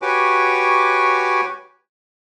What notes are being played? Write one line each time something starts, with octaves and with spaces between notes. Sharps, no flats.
F#4 G4 B4 C#5 G#5 D6